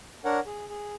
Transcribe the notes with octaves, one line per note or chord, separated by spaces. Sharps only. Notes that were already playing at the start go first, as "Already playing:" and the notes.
D4 A#4 C#5 F#5
G#4
G#4